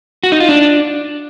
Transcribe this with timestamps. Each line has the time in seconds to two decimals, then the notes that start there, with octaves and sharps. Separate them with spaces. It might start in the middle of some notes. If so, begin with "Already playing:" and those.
0.23 F#4
0.32 D#4
0.40 F4
0.49 D4